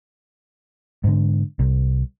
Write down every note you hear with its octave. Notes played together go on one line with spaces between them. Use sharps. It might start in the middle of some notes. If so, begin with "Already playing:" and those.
G#2 D3
C2